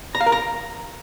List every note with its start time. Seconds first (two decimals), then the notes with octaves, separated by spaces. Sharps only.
0.15 A#5
0.21 F5
0.26 A#4
0.32 A#5